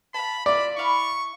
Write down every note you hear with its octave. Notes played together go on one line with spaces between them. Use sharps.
F5 G5 A5 B5
F4 D5 E5 A#5 B5
E4 F5 B5 C#6